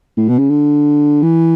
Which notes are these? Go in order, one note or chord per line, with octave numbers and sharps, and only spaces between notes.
A2
B2
C#3
D3
E3